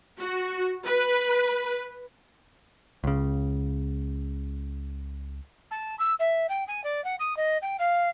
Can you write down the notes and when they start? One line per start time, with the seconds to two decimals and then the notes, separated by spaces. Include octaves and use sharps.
0.19 F#4
0.86 B4
3.04 C#2 C#3
5.70 A5
5.99 E6
6.19 E5
6.49 G5
6.67 G#5
6.83 D5
7.04 F#5
7.19 D#6
7.36 D#5
7.62 G5
7.79 F5